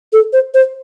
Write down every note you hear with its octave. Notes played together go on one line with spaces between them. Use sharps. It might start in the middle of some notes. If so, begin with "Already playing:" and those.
A4
C5
C5